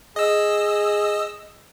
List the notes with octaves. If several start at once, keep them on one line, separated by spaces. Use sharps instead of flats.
G#4 D#5 E6